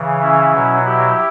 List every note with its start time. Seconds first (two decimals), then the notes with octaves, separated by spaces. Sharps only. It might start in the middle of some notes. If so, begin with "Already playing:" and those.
Already playing: C#3 E3
0.21 C#4 E4
0.53 B2 F#3
0.85 E4 G4